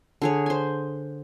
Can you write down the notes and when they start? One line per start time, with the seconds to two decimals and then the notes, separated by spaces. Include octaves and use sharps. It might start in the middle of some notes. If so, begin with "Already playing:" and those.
0.22 D3 G#4 C#5
0.46 C5 G#5